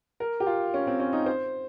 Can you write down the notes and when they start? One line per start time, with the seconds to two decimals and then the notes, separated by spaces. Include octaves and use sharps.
0.20 A#4
0.40 G4
0.46 F4
0.74 C#4
0.87 C4
1.00 C#4
1.13 D#4
1.26 C5